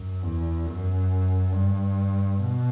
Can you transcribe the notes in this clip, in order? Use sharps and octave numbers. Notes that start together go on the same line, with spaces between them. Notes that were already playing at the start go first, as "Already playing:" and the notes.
Already playing: F#2
E2
F#2
G2
B2